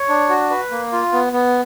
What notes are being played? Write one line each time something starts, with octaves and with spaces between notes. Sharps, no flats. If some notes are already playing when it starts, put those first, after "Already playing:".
Already playing: C#5
D4
F#4
B4
A#3
F4
B3
B3